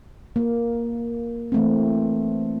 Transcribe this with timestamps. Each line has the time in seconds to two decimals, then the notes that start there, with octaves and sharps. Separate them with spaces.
0.36 A#3
1.52 E3 A3 C4